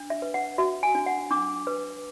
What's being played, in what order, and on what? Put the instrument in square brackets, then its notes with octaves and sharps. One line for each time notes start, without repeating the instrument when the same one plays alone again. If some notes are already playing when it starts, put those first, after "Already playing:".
Already playing: [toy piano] D4
E5
B4
F#5
F#4 E5
G#5
D4
F#5
D4 D6
B4